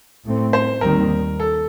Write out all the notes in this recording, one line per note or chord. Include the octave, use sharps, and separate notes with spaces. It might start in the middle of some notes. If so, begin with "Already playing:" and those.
A2 A3 C4
C5
D#2 D#3 G3 C4 A#4
A4